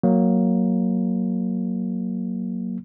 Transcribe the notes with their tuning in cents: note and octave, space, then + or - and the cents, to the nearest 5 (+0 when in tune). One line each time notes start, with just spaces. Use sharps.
F#3 +0 A#3 +0